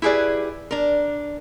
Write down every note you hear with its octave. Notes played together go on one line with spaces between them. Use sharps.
E4 G4 G#4 B4 D5
D4 A#4